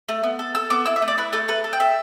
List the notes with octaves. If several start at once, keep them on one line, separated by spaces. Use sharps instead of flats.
A3
B3
A4
A4 E6
B3 D6
E4 E6
E5
A3
D5
E4 B4
A3 A4
A4 B4
A4
G5
A4 E5